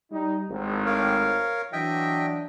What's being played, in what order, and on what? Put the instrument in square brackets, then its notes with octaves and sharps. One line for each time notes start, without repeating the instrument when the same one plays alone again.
[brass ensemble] G3 D#4
G#1 A2
[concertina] A#4 C#5 F5
[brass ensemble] E3 F#3 D4 [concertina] D#5 E5 G5